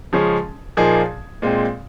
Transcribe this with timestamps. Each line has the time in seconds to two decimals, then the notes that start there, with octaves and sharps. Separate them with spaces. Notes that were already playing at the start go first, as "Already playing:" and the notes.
0.13 C#3 F3 G#3 C#4 G#4
0.77 A#2 F3 A#3 D#4 G#4
1.42 A#2 G#3 C4